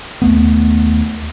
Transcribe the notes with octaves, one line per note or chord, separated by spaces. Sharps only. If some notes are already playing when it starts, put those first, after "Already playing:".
D#2 A3 B3